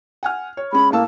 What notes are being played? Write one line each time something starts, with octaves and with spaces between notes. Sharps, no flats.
F#5 G#5 F6
C#5
G#3 C#4 B5
A2 A#3 A5 E6